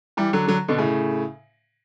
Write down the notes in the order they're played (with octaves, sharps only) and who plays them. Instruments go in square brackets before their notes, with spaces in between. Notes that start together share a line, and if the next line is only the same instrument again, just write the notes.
[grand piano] E3 G3
D3 F#3
D3 F#3
B2 D3
A2 C#3